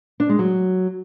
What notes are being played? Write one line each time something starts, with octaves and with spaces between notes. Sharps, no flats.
D4
G#3
F#3